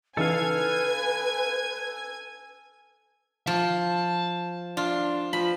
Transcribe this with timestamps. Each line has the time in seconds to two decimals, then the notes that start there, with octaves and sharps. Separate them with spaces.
0.17 C#3 E3 D#4 A4 B4 F5 G#5 G#6
3.47 F3 A5
4.77 D4 F4
5.33 F3 B5